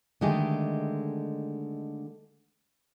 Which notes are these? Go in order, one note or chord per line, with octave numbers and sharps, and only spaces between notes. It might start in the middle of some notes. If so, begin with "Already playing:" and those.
D3 D#3 G#3 A3 G4